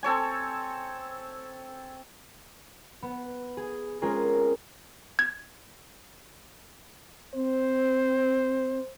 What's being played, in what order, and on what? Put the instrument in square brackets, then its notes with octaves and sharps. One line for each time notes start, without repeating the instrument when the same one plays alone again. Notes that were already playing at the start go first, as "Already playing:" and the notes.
[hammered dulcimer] C4 A4 C#5 G#5
[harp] B3
G#4
G#3 C4 C#4 F4 G#4 A#4
[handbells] G#6
[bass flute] C4 [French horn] C5